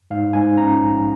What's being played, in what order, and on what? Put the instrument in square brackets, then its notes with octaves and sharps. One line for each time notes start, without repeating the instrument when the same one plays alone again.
[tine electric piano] G#2 F5
G#2 G#5
C#4 A#5
A#1